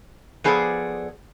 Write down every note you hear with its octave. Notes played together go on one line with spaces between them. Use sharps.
F3 B3 G#4 A4 C5 D5